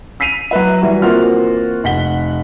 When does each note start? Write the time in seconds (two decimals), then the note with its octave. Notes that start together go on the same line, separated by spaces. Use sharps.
0.20 E6 B6 C7 D#7 F7
0.51 F#3 E4 B4 E5
0.82 E3 G3 E4 F#4 B4
1.02 E3 A#3 C4 F4 F#4 F6
1.84 F1 F#5 B6 G7